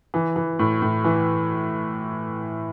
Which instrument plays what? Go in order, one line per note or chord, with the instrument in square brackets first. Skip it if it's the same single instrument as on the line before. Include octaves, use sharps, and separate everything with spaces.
[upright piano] E3
E3
A2
A2
E3